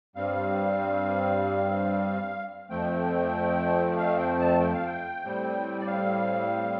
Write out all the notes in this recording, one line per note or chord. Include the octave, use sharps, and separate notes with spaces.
G2 G3 C4 F5
F2 F3 A3 C4 G5
F5
G5
A5
G5
F5
G5
A2 G3 C4
D5
F5